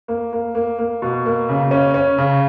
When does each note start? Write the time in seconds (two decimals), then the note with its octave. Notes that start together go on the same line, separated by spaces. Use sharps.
0.08 A#3
0.33 A#3
0.55 A#3
0.79 A#3
1.02 B2
1.26 A#3
1.49 C#3
1.71 C#4
1.94 C#4
2.18 C#3